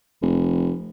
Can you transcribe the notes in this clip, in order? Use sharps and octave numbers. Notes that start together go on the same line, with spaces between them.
F1